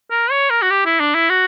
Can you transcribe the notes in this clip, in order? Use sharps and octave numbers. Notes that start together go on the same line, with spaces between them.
A#4
C#5
A#4
F#4
G4
E4
D4
E4
F#4